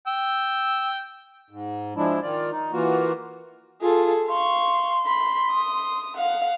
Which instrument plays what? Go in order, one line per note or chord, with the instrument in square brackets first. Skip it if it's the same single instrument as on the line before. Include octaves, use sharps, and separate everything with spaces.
[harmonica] G5 E6
[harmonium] G#2
F3 G#3 D4 E4
D#3 F4 D5
D#4
E3 A#3 F4 F#4
[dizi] F4 [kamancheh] G#4 A4
[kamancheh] F5 C#6 [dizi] C6
[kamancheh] B5
D#6
F5 F#5